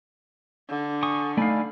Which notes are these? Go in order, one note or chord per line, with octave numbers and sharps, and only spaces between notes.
D3
G#5 C#6 D#6
A3 D#4 D5 F5 G#5 B5